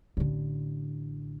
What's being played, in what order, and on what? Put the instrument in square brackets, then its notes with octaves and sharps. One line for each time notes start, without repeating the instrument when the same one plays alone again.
[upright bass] A1 D3